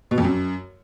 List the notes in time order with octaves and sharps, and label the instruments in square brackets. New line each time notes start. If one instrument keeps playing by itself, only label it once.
[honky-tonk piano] B2
F2
F#2